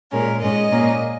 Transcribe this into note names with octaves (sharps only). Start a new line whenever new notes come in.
A#2 G#3 C#4 A#4
G#2 G#3 C#4 D#5
A#2 A#3 C#4